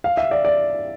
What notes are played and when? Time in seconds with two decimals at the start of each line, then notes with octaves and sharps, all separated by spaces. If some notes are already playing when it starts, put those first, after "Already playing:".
0.04 F5
0.17 E5
0.31 D5
0.45 D5